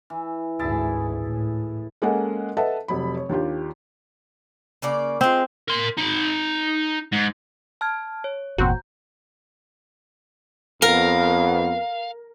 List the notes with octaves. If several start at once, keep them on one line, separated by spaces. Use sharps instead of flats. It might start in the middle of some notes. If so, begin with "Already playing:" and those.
E3
G#1 D2 G#2 E4 G#4 A5
A2
G#3 A#3 C#4 A4 D#5 F#5
A4 B4 D#5 E5 F#5 A5
F1 F#3 B5
C#5
D#2 D4 F4 G4
C#3 A#3 D5
G#3 C4 F4
A#4 C6
D#4 B5
G#2
A5 F6 G#6
C#5
G1 E2 A#2 C4 F#4 A#5 G6
F2 B3 A#4 F5